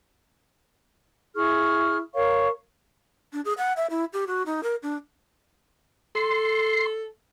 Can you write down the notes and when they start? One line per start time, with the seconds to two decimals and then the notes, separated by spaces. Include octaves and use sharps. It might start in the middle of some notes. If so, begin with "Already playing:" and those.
1.35 E4 G#4 C#6 F6
2.15 A#4 C#5 F5 C#6
3.33 D4
3.45 G#4
3.58 F#5
3.77 E5
3.90 E4
4.13 G4
4.27 F#4
4.46 D#4
4.63 A#4
4.83 D4
6.15 A4 C6